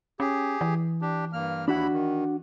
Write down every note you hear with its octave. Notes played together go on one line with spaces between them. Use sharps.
C#4 G4 G#4
E3
D4 G4
G2 A#3 F6
D#2 D4 E4 F#4 F#5 B5
D#3